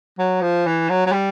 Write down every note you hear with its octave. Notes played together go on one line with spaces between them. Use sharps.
F#3
F3
E3
F#3
F#3
G3